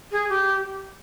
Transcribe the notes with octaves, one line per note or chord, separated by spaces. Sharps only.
G#4
G4